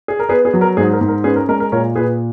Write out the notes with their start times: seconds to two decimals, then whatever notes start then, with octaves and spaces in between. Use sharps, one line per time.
0.08 G#4
0.19 A#4
0.29 B3 G#4 B4
0.45 G#4
0.54 F#3
0.61 A#4
0.77 G#2 G#4
0.93 A#4
1.01 G#2
1.08 A#4
1.24 C#4 G#4 B4
1.36 A#4
1.49 G#3 A#4
1.60 A#4
1.72 A#2 A#4 C#5
1.96 A#2 G#4 B4